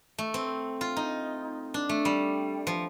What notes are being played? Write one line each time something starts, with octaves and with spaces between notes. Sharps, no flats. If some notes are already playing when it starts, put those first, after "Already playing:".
A3
C4
F4
D#4
D4
A3
G3
F3